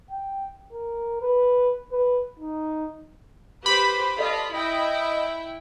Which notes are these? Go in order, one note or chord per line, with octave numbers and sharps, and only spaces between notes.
G5
A#4
B4
B4
D#4
G4 B4 C5 B5
F4 A4 D5 D#5
E4 D#5 G5